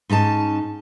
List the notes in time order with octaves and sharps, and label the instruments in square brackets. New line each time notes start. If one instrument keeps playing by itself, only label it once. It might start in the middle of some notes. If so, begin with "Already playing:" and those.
[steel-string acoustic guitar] G#2 C#4 D#4 A5